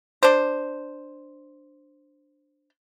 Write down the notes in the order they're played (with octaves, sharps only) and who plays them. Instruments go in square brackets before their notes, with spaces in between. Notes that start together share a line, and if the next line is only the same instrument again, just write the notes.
[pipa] D4 C5